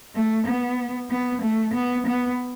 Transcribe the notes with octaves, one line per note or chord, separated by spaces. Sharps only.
A3
B3
B3
A3
B3
B3